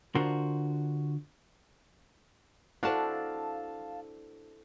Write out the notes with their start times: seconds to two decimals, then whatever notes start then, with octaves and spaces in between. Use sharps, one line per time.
0.15 D3 D4 F4 F#4 A#4 C5
2.83 D4 E4 F#4 A4 C5 D5 F5 A5